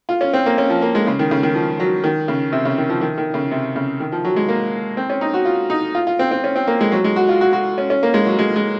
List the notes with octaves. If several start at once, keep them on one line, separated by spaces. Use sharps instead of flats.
F4
C#4
C4
A#3
C#4
F3
A#3
G#3
C#3
D#3
C#3
D#3
F3
F#3
D#3
C#3
C3
C#3
D#3
F3
D#3
D#3
C#3
C3
C#3
D#3
F3
F#3
G#3
A#3
C4
C#4
D#4
F#4
F4
D#4
F4
F4
C4
C4
C#4
C4
A#3
G#3
F#3
G#3
F#4
F4
F#4
F#4
C#4
C#4
A#3
G#3
F#3
G#3
G#3